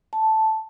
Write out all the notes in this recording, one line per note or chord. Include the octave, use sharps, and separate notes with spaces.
A5